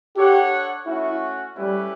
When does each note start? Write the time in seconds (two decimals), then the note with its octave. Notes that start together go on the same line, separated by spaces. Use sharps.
0.16 D4 G4 A4 C#5 F#5
0.86 A3 C#4 E4 F#4
1.56 G3 A3 C#4 E4 G4 B4